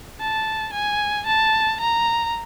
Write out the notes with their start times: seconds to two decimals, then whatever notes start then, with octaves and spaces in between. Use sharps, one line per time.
0.20 A5
0.74 G#5
1.27 A5
1.81 A#5